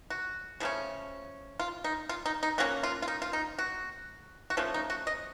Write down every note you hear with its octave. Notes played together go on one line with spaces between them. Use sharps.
F#4
C#3 F3 A3 C#4
F4
D#4
F4
D#4
D#4
F3 A#3 C#4 F#4
F4
F4
D#4
F4
D#4
F#4
F#4
F3 A3 C#4 F4
D#4
F#4
D#5